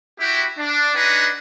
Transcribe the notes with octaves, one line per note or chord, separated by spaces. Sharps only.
E4 F#4 G4
D4
D4 D#4 F#4 G#4 B4 F#5